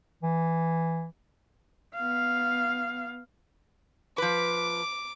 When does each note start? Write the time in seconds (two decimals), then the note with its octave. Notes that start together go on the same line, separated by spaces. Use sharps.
0.23 E3
1.95 B3 F5
4.18 F3 B4 D6